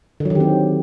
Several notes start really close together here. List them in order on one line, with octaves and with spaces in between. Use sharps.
D3 F#3 D#3 G4 C4